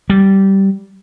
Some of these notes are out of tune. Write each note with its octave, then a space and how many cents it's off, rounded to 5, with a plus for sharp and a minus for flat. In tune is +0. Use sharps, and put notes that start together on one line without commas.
G3 -15